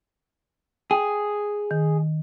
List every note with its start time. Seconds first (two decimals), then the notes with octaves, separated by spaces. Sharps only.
0.91 G#4 G5
1.71 D#3